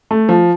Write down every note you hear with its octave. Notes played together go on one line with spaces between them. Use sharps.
A3
F3